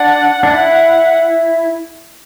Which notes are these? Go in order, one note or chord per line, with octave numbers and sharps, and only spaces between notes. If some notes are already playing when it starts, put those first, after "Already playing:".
Already playing: D4 F#5
D4
E4